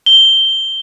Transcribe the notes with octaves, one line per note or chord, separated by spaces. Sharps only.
G7